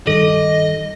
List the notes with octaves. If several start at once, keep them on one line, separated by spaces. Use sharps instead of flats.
G2 D#3 A4 D#5